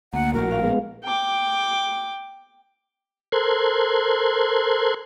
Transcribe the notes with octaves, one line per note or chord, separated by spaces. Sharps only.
D2 A#3 F#5
A#1 A2 F#4 A#4
F5
G#3 B3
G5 D6
A4 A#4 C5 C6 F#6 G#6